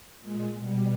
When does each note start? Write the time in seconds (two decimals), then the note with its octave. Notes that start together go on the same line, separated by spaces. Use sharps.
0.20 A#2 G#3
0.56 B2 G3